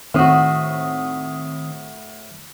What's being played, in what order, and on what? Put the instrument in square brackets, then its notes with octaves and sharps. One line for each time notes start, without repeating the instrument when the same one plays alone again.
[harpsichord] A2 F#4 [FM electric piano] D#3 C4 D#6